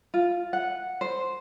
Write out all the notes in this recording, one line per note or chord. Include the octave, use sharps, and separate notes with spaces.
F4
F#5
C5